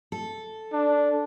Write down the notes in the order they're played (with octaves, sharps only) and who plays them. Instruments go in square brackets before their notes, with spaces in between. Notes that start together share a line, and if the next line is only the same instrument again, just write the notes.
[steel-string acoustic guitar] A4
[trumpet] D4